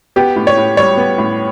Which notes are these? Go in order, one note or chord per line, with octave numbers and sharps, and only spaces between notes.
B3 G4
A2
C#5
A2
G3 C#5
B3
A2